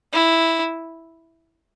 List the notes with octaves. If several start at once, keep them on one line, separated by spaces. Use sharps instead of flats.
E4